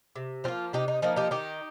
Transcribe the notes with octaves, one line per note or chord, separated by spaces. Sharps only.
C3
F3 A#3 C4 F4
C3 D#4 G4
D#4
F3 A#3 D#4
D#4 G4
D#3 D#4 G4